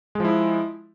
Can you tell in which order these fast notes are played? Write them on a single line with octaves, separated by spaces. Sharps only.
G#3 F3 E4